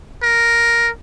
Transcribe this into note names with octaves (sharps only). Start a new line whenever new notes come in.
A#4